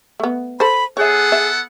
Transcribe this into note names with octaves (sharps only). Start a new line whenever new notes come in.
A3 B3
A4 C5 B5
B3 G#4 A4 C#5 E5 F#5
E5